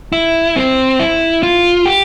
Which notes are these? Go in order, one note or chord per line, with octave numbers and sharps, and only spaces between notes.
E4
C4
E4
F4
G4